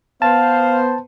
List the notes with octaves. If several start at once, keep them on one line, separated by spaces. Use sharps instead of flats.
B3 C5 F5 A5